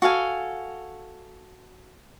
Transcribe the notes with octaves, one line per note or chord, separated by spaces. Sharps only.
F#4 A4 F5 G#5